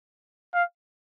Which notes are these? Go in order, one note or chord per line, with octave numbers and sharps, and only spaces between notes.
F5